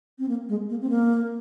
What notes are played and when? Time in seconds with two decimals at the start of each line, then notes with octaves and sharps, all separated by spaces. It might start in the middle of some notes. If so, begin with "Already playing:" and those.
0.19 C4
0.28 A#3
0.49 G#3
0.69 A#3
0.81 C4
0.89 A#3